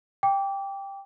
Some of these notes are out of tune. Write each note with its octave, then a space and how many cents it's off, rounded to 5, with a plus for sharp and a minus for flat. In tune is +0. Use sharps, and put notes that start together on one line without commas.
G5 +10 D6 -20